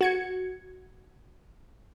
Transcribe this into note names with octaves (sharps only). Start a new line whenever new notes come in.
F#4 G#6 C#7